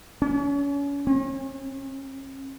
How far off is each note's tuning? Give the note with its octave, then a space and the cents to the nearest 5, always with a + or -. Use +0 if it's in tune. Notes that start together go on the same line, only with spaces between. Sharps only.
C#4 +35
C#4 -40